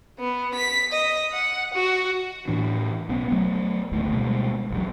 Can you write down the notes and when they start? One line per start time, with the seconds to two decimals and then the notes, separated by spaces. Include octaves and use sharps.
0.19 B3
0.54 B6
0.93 D#5
1.32 F#5
1.74 F#4
2.48 A2 E3 D4
3.09 B1 B3 C#4
3.28 F#3 A3 B3
3.91 G#1 D2 G#2 A3
4.13 B2 G3 G#3 A#3
4.70 A#1 E2 F#3